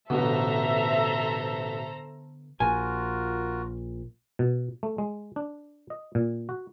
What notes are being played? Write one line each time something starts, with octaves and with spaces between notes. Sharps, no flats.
A1 B2 D3 B3 A4 C5 E5 A#5
A#1 A#2 F4 F#4 A#4 G#5
B2
A3
G#3
D4
D#5
A#2
F#4